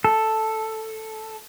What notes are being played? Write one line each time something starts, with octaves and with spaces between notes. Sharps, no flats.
A4